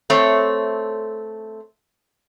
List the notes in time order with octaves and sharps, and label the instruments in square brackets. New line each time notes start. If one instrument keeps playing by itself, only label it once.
[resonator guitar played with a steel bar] A3 C4 C#5